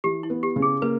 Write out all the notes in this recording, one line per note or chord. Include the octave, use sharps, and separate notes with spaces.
E3 G4
E4
B3
G4
C#3
G#4
A#3 B4